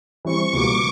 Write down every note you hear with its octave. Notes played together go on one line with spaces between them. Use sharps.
E3 G3 C4 C#6
C#2 B2 G3 A#3 D6